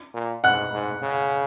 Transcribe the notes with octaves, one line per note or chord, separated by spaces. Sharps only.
A#2
G#2 F#5 F#6
G#2
C#3